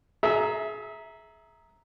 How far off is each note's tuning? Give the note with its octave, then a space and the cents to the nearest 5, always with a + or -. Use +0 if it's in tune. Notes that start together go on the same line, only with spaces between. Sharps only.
G#4 +30 E5 -10 A#5 +0